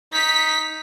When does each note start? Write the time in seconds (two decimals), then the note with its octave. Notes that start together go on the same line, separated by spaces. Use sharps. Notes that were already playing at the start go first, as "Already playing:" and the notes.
0.13 D#4 B6